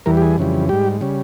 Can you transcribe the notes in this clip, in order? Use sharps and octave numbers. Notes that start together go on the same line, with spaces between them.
E2 E3 G3 A#4
G4
G#4
F2 C#3 E3 G3
G#2 G3 G4
C#3 G3